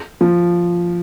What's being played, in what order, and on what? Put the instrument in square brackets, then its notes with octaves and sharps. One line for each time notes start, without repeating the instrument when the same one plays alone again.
[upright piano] F3